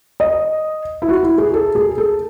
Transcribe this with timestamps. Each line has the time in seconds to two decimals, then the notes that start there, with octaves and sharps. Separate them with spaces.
0.20 D#5
1.02 E4
1.09 F#4
1.23 E4
1.38 G#4
1.53 A4
1.75 G#4
1.98 A4